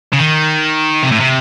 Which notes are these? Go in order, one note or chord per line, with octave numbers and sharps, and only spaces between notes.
C#3
D#3
C3
A2
C3